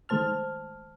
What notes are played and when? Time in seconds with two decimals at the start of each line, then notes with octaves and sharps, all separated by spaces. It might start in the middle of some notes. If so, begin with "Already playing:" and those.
0.09 D#3 G#3 A3 C5 A5 F6